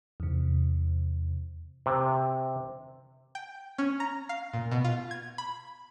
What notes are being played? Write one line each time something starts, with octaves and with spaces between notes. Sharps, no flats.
E2 C3
C3
G5
C#4
A#5
F5
A#2
B2
F4
G#6
B5